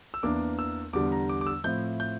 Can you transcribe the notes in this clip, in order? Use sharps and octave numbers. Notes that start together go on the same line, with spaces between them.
E6
E2 E3 A#3 D4 D6
E6
E2 D3 G3 D4 D6
A#5
D6
D6
E6
A2 F3 C4 E4 G6
G6